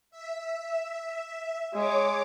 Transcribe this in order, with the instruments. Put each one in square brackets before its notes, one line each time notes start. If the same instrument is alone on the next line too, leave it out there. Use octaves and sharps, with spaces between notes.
[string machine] E5
[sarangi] G#3 [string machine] C#5 D6